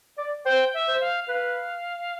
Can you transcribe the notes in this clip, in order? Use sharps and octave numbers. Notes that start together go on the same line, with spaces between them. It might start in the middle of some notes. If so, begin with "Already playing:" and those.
D5
C5 G5
E5
C5
F5
B4 F5